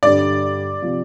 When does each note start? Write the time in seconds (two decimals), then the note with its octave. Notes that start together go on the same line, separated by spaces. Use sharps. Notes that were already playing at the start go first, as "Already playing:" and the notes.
0.03 G2 D3 G3 D5
0.82 C3 F3